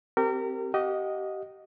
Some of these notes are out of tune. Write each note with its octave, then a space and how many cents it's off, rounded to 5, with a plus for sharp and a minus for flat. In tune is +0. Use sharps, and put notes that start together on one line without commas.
C4 +0 G4 -20 A#4 -30
G4 -30 D#5 +0 F#5 -45